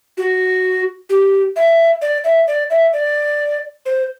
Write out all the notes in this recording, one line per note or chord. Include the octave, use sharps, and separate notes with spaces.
F#4
G4
E5
D5
E5
D5
E5
D5
C5